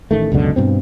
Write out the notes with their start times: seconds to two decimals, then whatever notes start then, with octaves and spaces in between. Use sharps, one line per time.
0.11 A1 D#3 A3
0.32 C#2 F#2 B2 D3
0.56 G2 B2 C4